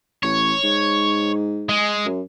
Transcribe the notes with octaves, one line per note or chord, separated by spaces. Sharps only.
A1 C#5
G#2
G#3
F#2